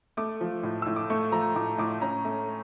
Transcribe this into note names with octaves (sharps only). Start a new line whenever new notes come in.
A3 D6
F3
A2
A2 E6
D6
A3 C#6
F3 A#5
A2 D6
A2 D6
C#4 A#5
A3